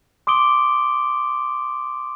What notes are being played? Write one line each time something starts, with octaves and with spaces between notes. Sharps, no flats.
C6 D6 D#6 D7 G7